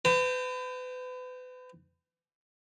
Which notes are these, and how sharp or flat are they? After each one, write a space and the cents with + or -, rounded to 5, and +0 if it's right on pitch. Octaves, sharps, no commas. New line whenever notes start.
B4 +35 G5 +0 A#5 -45